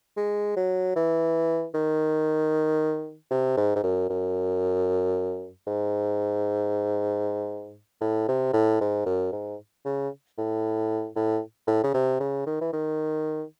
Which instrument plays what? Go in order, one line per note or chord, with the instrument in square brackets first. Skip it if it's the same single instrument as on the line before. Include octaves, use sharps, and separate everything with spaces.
[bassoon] G#3
F#3
E3
D#3
C3
G#2
G#2
F#2
F#2
G#2
A2
C3
A2
G#2
F#2
G#2
C#3
A2
A2
A2
C#3
C3
C#3
D#3
E3
D#3